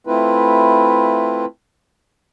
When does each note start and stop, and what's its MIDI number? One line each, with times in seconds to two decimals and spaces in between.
0.07 1.45 57
0.07 1.45 60
0.07 1.45 64
0.07 1.45 65
0.07 1.45 71